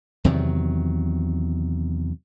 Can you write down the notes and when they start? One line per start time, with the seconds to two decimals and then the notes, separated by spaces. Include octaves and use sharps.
0.24 E2 C3 D#3 F#3